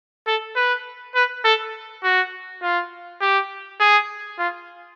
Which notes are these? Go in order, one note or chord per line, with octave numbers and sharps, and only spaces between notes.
A4
B4
B4
A4
F#4
F4
G4
G#4
F4